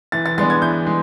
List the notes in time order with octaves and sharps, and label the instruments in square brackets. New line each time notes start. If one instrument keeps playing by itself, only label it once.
[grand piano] E3 A6
A6
G#3 B3 D4 A6
G#6
E3 G6
G#3